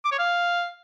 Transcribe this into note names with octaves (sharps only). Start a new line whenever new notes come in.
D6
C#5
F5